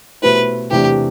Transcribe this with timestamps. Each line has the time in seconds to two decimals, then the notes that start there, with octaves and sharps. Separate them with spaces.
0.22 B2 A3 E4 G4 B4 C5
0.71 E2 C3 E3 A3 D4 G4